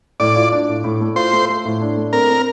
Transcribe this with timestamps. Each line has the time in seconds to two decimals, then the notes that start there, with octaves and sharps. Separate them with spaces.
0.20 A2 D5
0.36 F4
0.52 D4
0.69 A2
0.84 A2
1.01 A3
1.16 F4 C5
1.33 A3
1.49 A3
1.65 A2
1.81 D4
1.97 A3
2.13 C4 A#4
2.29 C4